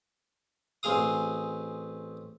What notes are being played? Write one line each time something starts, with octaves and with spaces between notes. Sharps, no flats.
A1 C4 G#4 F5 D#6